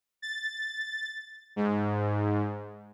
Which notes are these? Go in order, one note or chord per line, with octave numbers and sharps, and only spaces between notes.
A6
G#2